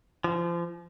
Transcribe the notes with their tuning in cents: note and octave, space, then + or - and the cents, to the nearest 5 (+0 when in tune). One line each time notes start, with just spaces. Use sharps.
F3 -30